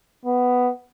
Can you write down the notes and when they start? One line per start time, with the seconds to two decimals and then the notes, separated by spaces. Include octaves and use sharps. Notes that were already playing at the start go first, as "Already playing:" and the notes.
0.25 B3